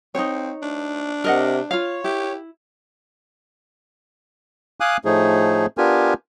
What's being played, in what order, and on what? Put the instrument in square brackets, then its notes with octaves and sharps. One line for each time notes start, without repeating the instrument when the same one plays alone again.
[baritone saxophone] C4 [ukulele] D#4 C#5
[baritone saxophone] D4
[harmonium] C3 [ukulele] A#4 D#5 F#5
[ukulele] F4 F5 [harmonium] C#5
[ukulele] E4 [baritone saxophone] G4
[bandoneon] F5 G#5 D6 D#6 F#6
A2 F3 A3 D#4 G#4
B3 D4 F4 G4 A#4 G#5